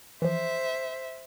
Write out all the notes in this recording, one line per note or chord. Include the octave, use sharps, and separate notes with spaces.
E3 F3 C5 E5